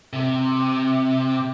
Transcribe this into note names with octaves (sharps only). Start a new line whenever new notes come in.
C3